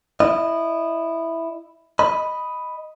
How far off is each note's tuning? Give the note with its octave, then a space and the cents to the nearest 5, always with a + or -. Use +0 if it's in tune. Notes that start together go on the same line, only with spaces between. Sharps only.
E4 +0 D#5 -20
D#5 +0 B5 +0